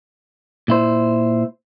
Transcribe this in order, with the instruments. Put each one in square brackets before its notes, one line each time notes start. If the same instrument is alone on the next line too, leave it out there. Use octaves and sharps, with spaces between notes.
[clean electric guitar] A#2 E4 C5